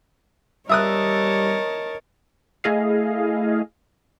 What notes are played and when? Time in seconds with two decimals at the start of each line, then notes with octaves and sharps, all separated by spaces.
0.69 G3 A#4 C#5 D#5 E5 A5 D#6 F#6
2.64 A3 E4 G#4 D#5 F5